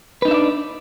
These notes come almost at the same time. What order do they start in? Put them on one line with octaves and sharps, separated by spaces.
B4 D#4 D4 E5 D5